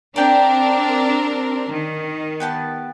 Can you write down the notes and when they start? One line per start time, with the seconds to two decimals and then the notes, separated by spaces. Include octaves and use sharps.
0.16 C4 D4 G4 A#4 D5
1.70 D#3
2.40 B3 G4 A5